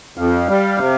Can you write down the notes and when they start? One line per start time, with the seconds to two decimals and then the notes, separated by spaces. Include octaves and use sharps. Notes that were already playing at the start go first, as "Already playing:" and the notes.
0.18 F2 F5
0.49 G3
0.78 C3